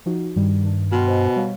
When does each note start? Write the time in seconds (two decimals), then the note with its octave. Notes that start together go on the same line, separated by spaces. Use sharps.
0.06 F3 D#4 F#4
0.36 G2 D#3 G3
0.63 D#3 D4
0.92 B2 G5 C6 F6
1.08 C5 D#5 G#5
1.36 G3 C#5 F5